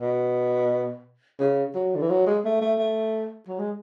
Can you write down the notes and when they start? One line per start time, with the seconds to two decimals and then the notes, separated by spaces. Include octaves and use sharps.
0.01 B2
1.39 C#3
1.75 F#3
1.95 D3
2.02 E3
2.10 F#3
2.27 G#3
2.45 A3
2.62 A3
2.79 A3
3.48 F#3
3.59 G#3